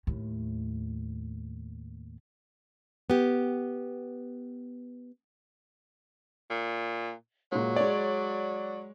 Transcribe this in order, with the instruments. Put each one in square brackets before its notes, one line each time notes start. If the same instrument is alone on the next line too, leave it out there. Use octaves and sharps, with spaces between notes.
[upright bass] D#2 A2
[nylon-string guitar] B3 G4
[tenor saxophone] A#2
[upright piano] A#2 G#3 [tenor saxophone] F#3
[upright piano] G#3 C#5 [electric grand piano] D5